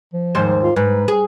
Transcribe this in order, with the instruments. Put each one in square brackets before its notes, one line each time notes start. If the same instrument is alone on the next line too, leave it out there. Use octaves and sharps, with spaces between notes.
[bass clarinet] F3
[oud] D#2 G#2 C5
[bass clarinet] F4
[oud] G#2 [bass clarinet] B4
[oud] G#4